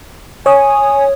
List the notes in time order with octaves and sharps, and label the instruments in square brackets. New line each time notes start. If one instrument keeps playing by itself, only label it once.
[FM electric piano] C#5 D#6 [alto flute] G#5